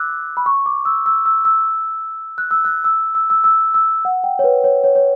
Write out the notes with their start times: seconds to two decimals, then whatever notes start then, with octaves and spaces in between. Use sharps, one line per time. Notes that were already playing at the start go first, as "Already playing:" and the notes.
Already playing: D6 E6 F#6
0.37 B5
0.46 C#6
0.66 D6
0.85 E6
1.06 E6
1.26 E6
1.45 E6
2.38 F#6
2.51 E6
2.65 F#6
2.84 E6
3.15 E6
3.30 E6
3.44 E6
3.74 E6
4.05 F#5
4.24 G5
4.39 C#5
4.44 B4
4.64 C#5
4.84 C#5
4.95 C#5